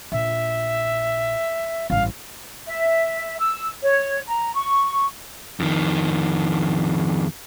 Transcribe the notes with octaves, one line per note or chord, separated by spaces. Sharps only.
A#1 E5
A1 G2 F5
E5
E6
C#5
A#5
C#6
F2 D#3